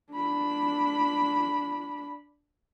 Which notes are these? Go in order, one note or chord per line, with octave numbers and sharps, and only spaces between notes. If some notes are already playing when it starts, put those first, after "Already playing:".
D4 B5